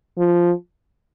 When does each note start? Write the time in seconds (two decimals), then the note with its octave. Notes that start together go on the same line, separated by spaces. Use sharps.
0.18 F3